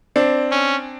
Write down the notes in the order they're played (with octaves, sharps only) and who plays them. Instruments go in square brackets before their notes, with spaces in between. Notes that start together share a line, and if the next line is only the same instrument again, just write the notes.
[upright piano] C4 D4
[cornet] C#4